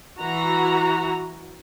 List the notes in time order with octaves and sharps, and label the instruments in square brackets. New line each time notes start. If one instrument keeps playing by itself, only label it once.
[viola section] E3 F#4 A#5